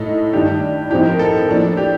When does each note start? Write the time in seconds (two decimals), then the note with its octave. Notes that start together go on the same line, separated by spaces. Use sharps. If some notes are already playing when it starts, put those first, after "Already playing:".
Already playing: A2 A3 D#4 A4
0.33 G2 D#3 G3 D4 G4
0.90 A2 F3 C4 D#4 G4
1.06 A#4
1.19 A4
1.47 A2 F3 A#3 D4
1.77 G4